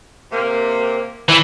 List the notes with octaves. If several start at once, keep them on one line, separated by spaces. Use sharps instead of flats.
C3 A#3
D3 E3 G3 E5